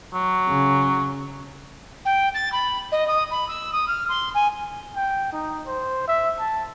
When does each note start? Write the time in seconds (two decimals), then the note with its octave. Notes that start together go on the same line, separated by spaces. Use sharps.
0.14 F#3
0.49 C#3
2.05 G5
2.34 A6
2.52 B5
2.92 D#5
3.08 D#6
3.31 B5
3.48 E6
3.73 D#6
3.88 F6
4.09 C6
4.34 G#5
4.95 G5
5.33 D#4
5.66 C5
6.07 E5
6.39 A5